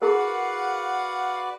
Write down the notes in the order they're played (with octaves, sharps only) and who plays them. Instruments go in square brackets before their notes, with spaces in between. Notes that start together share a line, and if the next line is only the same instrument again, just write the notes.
[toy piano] E4 G#4 A#4 [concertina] F#4 B4 D5 [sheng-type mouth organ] F5 F#5